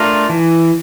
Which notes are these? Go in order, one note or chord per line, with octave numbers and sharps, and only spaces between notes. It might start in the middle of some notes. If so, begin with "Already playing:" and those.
Already playing: A3 D4 F4 A#4
E3